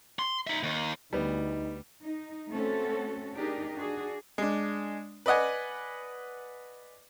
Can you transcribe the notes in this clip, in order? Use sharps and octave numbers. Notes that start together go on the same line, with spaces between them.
C6
D#4 E5
D#2
D2 G3 B3 D#4
D#4
A3 C4 C#4 F#4 A4
D4 D#4 G4 G#4 A#4
D4 F#4 G#4
G#3 D4
B4 D5 D#5 F#5 G#5